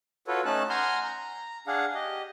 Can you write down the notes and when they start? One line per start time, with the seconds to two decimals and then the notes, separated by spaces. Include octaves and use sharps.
0.27 F4 F#4 A4 B4 C#5
0.45 A3 C#4 D#4 A5 F#6
0.69 F#5 G#5 A#5 C6 F6 G6
1.04 A#5
1.67 D4 G#4 F5 F#5
1.94 G4 D#5